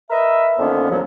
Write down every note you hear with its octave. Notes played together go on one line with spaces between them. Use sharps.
A#4 B4 D#5 E5
F2 D3 D#3 A#3 B3 C#4
C2 F3 F#3